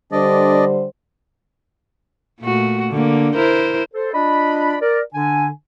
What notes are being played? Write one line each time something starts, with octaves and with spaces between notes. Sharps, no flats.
D3 G3 D4 C5 D5 D#5
A#2 A3 F#4
D3 A#3
E4 A#4 C5
A4 C5
D4 F4 D5 D#5 B5
A#4 D5
D3 D4 G#5